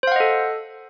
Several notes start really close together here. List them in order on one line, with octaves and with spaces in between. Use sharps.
C5 F5 F#5 D#5 A4